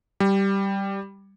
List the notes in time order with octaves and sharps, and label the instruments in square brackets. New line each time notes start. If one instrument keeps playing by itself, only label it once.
[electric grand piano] G3